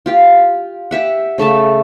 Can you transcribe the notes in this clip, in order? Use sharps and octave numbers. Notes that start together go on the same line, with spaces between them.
F4 G4 F5
G4 E5 F#5
C#3 A3 E5 A5